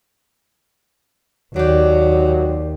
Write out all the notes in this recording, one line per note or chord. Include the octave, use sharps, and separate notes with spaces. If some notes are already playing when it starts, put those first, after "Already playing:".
D#2 F#3 D4 G4